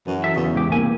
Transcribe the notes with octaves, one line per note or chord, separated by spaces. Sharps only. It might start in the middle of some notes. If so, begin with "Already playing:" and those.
F#2 E3
A4 E5
E2 C#3
G#2 C#3 G4
C2 A#3 C4 G#5